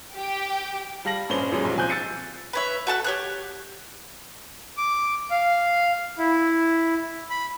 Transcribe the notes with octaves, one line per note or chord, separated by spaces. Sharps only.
G4 G5
G3 F5 A5 A#6 F#7
A#1 G2 C#4 D4 C5 G7
D#1 F#2 G#3 C#4
B1 F3 G3
C3 F3 G#5 F#6 G6
E6 A6 C#7 D#7
B4 C#5 E5
F#4 A4 A5 F#6
G4 C#5 F#6
D6
F5
E4
B5